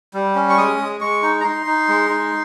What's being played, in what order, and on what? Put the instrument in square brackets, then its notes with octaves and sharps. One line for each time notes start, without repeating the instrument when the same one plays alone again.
[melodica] G3
C#4
C#6
G#3 D#6
G#3
G#3 C#6
D#4
A#5
D#4 C6
D#4
G#3
D#4